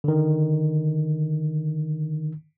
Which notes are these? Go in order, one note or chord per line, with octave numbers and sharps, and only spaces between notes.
D3 D#3